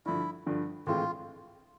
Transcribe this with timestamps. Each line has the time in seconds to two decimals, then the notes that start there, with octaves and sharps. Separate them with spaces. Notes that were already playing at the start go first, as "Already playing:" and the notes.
0.06 G2 D3 F3 E4
0.46 G2 D3 F3
0.87 A2 E3 G#3 C4 E4 F4